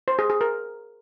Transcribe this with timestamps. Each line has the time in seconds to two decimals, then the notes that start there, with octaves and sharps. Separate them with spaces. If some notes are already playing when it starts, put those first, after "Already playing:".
0.08 C5
0.19 G#4
0.30 G#4
0.41 A#4